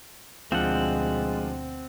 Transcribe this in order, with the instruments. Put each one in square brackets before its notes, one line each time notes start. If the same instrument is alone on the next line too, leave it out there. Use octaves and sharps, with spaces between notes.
[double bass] D2 B2 [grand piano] F3 D4 F4 [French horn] G#3 [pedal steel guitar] C4 F#5